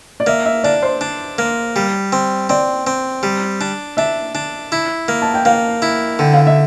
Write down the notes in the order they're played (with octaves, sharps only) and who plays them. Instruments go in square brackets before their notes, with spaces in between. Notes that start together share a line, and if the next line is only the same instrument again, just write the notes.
[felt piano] D5
[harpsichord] A#3 [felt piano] E5
[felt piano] E5
[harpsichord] D4 [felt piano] D5
[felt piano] C5
[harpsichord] D4
A#3
G3
C4
[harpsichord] C4 [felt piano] D5
[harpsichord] C4
G3
D4
[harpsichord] D4 [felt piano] E5
[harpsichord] D4
E4
A#3
[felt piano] A5
G5
[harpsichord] A#3 [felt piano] F5
[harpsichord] E4
[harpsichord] D3 [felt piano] G5
[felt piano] F5
E5